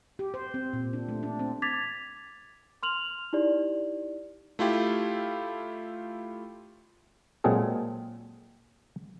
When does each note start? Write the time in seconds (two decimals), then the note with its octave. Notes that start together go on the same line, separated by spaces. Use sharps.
0.19 G4
0.34 C5
0.54 C4
0.73 A#2
0.93 D4
1.09 A3
1.23 D4
1.39 C4
1.62 D6 G#6 A6 B6 F7
2.83 C6 F6 F7 F#7
3.33 D#4 E4 G4 D5
4.59 A3 E4 F4 G4
7.44 A#2 F#3 G#3 C4 G#4 A4